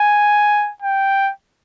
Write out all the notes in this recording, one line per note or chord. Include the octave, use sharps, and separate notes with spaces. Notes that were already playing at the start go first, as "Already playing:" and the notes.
Already playing: G#5
G5